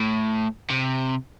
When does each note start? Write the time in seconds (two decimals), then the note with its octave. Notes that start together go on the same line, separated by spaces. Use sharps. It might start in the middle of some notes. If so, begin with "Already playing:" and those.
Already playing: A2
0.70 C3